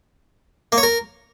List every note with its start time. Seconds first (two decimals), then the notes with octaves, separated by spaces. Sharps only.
0.72 A#3
0.78 C#5
0.83 A#4